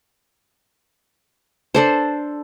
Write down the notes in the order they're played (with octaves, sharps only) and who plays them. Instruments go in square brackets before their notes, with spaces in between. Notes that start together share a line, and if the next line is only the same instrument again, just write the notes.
[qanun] D4 A4 C5